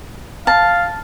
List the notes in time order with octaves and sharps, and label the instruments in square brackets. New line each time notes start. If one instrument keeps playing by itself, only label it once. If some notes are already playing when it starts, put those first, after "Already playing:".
[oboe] F5 [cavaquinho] A5